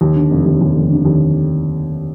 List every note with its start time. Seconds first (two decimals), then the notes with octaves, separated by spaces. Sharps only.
0.01 D#2
0.16 D3
0.31 F1
0.46 D#2
0.61 D#2
0.75 F1
0.91 D3
1.05 D#2